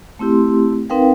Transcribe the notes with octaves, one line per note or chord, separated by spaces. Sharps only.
A3 C4 E4 G4 C6
C4 D#4 A#4 B4 F5 G5